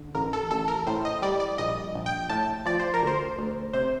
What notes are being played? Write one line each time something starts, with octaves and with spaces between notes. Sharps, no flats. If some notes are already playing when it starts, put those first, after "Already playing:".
Already playing: D3
A1 A#4
A4
A1 A4
A#4
A2 C5
D#5
G3 D5
D5
A#1 D#5
A#1
G5
A2 A5
F3 D5
C5
A#4
D2 C5
D2
C3 C5